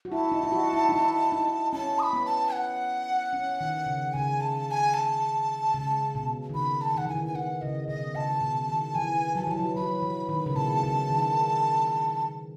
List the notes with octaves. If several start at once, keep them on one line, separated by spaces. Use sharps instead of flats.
F#4
E4 A5
D#4
E4
F#4
E4
D#4
E4
D#4
C#4 A5
D#6
B5
B3
A5
F#5
C#4
D#3
C#3
C#3 G#5
A5
A5
G#5
A5
C#3
B2
D#3
C#3 B5
A5
D#3 F#5
E3 G#5
D#3
G#5
D#3 F#5
C#3 D#5
B2 D#5
C#3 A5
B2
D#3
E3 G#5
F#3 A5
G#5
E3 A5
F#3
F#3 B5
E3
D#3
C#3
B2 A5
C#3
D#3